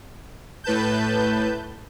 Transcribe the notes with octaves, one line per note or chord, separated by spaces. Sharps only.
A2 B4 A5 G6